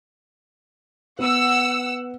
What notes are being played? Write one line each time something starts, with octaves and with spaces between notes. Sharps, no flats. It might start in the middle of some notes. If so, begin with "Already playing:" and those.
B3 F#5 E6